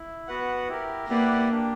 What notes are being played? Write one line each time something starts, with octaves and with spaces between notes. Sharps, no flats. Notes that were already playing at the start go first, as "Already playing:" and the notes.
Already playing: E4
B3 F#4 B4 F#5
E4 G4 A#4
A#3 E4 G4 B4 D5 F#5
A#3 D4 G4